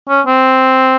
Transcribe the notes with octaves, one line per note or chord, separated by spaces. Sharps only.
C#4
C4